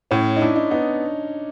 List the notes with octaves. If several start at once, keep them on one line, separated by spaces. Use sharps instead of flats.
A2 C#4
D#4
D4 E4
D#4
B3 D#4